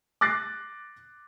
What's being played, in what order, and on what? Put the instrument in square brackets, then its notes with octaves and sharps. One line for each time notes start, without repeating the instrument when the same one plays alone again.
[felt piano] D6 F#6 A6 A#6 C7